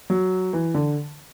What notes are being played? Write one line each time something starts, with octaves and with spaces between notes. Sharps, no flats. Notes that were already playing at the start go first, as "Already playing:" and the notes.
F#3
E3
D3